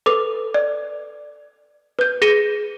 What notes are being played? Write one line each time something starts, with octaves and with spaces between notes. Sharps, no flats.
A4 B4 D6
D5
B4 G6
G#4 A#6 C#7 D#7 G7